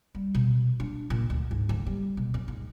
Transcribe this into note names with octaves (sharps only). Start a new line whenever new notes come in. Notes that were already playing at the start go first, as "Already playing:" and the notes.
G3
B2
D4
A#2
D2
G#2
D2
G3
B2
F#2
G#2